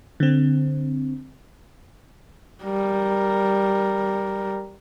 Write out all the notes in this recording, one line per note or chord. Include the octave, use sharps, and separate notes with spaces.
D3 C4
G3 A#4